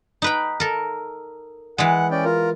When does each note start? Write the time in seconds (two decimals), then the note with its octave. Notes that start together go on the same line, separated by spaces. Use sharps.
0.22 D#4 B4 G5
0.60 A4 A#4
1.78 E3 G#3 F#5
2.11 C#4 D5 G5
2.25 F4 A#4